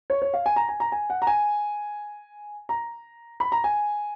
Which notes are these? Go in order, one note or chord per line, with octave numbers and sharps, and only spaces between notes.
C#5
C#5
F5
G#5
A#5
G#5
A#5
G#5
F#5
A#5
G#5
A#5
B5
A#5
G#5